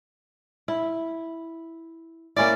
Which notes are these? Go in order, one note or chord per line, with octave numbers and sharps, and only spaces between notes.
E4
A#3 C#4 E4 D5